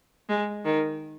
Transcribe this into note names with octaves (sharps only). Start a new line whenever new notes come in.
G#3
D#3